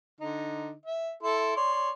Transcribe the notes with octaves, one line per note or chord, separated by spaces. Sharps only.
D3 D#4
E5
E4 A4 C6
C#5 D5 C6